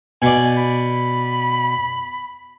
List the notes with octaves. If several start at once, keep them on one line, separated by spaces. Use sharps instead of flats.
B2 D5 G#5
B5